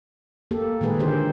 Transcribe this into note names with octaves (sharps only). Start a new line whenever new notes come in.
A#3 G4 A4
A#2 D#3 G#3 G#4 B4
D3 D#3 G4 C5